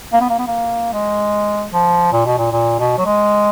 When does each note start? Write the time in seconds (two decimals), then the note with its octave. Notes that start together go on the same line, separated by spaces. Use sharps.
0.13 A#3
0.21 B3
0.30 A#3
0.39 B3
0.47 A#3
0.93 G#3
1.73 F3
2.13 A#2
2.26 B2
2.39 A#2
2.52 A#2
2.79 B2
2.99 F#3
3.06 G#3